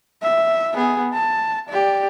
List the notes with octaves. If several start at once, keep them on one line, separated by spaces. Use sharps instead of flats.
E5
B3 G#4
A5
G4 D5